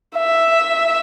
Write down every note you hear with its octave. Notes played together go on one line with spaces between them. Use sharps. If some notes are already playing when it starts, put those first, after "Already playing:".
E5